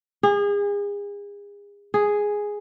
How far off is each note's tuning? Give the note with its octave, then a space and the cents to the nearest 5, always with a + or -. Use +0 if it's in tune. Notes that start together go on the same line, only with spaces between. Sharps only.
G#4 -35
G#4 +0